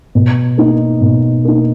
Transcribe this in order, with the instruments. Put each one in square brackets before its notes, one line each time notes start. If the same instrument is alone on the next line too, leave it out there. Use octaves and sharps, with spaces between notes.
[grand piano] B2
A#3 D#4
B2
A#3 D#4